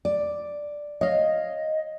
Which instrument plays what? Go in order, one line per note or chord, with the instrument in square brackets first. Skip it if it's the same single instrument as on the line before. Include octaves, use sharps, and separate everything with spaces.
[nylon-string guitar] D5
[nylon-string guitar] C#5 F5 [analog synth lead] D#5